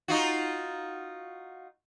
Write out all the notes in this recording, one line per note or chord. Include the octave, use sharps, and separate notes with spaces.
D#4 F4 F#4